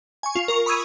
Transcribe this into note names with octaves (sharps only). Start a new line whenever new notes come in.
G#5 C#6
F4
A#4 C#6
B5 C#6 D#6 E6 G#6 D#7